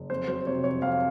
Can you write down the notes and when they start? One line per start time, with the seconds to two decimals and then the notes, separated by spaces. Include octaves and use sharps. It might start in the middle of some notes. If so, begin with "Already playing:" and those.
Already playing: F#1
0.10 F2 C5
0.28 F#3 C5
0.47 C3 C#5
0.64 F2 C#5
0.82 F2 F5